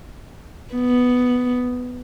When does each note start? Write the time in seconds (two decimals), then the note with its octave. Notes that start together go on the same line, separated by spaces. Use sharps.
0.74 B3